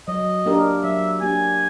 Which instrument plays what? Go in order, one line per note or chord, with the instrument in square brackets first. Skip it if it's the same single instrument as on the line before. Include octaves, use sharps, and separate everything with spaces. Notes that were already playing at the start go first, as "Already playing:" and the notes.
[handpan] F#3 [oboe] D#5
[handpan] A#3 D4 G4 A#4
[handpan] F#3 [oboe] E5
[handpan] A#3 D4 G4 A#4 [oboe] G#5